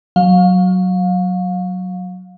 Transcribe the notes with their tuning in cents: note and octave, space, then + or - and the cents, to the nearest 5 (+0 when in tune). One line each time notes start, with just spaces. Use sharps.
F#3 +0 F5 +30